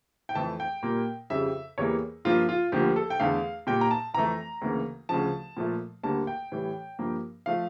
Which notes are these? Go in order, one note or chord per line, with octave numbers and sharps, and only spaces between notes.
G5
F2 E3 A3 A5
G5
A#2 G3 A#3
F2 C#3 G3 E5
E2 E3 G3 A#3 C#5
G2 F3 A#3 F4
F4
D2 D3 F3 A#3 G4
A4
G5
E2 D3 A3 F5
A#2 G3 A#3 G5
A#5
A5
F2 E3 A3 A#5
D2 C#3 E3 A#3
D2 C#3 F3 A5
A#2 F3 A3
D2 D3 G3 A#3 A5
G5
A2 E3 G3
G2 F3 A#3
F3 A3 F5